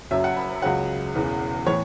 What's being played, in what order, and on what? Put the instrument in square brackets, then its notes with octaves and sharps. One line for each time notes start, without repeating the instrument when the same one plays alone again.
[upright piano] F#1 F#2 F#3 E5
F#5
B5
C#2 C#3 F#3 F#5
E1 E2 C#3 E3
A2 E3 C#5